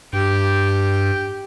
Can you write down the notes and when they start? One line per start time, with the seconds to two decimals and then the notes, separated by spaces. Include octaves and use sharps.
0.13 G2 G4 G5